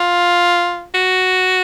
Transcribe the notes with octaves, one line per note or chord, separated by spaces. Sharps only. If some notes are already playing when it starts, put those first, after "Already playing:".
Already playing: F4
F#4